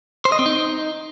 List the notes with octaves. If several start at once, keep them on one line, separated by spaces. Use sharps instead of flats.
C5
D#5
C4
D#4